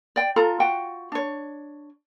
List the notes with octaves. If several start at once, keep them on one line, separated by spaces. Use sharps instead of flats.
D5 G5
F4 A4 A#5
F4 F#4 F#5 G5
D4 C#5